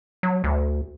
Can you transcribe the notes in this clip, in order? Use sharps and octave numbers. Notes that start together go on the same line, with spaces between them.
F#3
D2